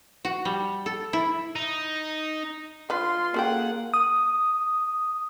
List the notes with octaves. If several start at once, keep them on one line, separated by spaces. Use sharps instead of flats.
F#4
G3
A4
E4
D#4
D3 F4 B4 C6
A#3 C#4 G#4 A4 F#5 G5
D#6